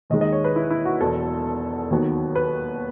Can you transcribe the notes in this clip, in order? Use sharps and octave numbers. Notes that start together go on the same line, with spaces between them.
D#2 D#3 G#3 D#5
D#5
C#5
B4
E4
E4
F#4
E1 E2 B2 F#3 A4
D#2 D#3 F#3 B3
B4